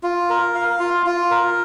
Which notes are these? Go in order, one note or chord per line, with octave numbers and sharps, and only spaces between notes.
F4
A#4
F5
F4
F4
A#4